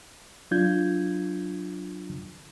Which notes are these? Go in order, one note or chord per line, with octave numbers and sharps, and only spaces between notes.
F#3 D4 F4 G6 G#6